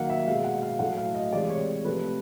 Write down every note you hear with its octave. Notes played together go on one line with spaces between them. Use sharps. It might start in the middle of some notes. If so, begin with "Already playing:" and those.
Already playing: D#3 F#3 A#3 F5 F#5
E5
B2 G#3 F5
F#5
F5
A2 F#3 A3 F#5
F5
D#5
C3 E3 G#3 D5
C#5
C3 F3 A3 B4